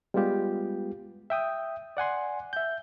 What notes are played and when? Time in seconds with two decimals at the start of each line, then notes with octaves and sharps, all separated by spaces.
0.14 G3 G#3 B3 F4 G4
1.30 E5 G5 D#6
1.97 D5 F#5 G#5 C6
2.53 E5 G6